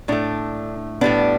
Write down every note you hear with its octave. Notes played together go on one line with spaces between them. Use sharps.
A2 A3 D4
A2 G3 B3 D4